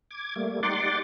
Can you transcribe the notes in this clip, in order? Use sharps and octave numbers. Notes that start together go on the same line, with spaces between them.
D6 G#6
G3 A3 A#3
D#4 G4 D5 F#5 C6 D6